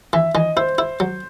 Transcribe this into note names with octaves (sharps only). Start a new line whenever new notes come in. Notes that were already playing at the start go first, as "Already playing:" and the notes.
E3 E5
E3 D#5
E4 C5
E4
F#3